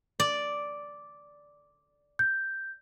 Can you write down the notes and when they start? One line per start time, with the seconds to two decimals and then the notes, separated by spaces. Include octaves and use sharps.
0.20 D5
2.19 G6